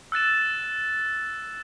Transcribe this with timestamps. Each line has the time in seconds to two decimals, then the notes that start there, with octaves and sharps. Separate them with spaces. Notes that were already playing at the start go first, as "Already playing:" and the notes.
0.12 E6 F#6 A6 E7